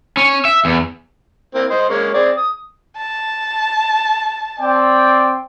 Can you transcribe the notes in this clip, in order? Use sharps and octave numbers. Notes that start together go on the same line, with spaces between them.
C#4
E5
E2
A#3 C4 E4
C5 D#5
G#3 A#3 C#4
C4 G#4 D5
D#6
A5
C4 D5 G5